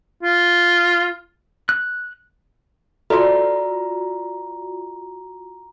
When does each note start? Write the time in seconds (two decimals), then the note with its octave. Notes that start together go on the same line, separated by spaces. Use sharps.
0.23 F4
1.69 F#6
3.10 F4 F#4 A4 C5 D5 A#5